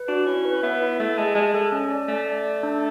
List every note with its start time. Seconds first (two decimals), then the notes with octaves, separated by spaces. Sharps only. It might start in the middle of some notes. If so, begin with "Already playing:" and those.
Already playing: B4
0.08 D4 F#4
0.26 C#4 E4
0.45 B4
0.63 B3 E5
0.81 E4
1.00 A3 E5
1.18 G#3 A5
1.35 G#3 A5
1.54 G#3 A4
1.72 C#4
1.90 D5
2.08 A3 D5
2.27 D5
2.45 D5
2.63 D4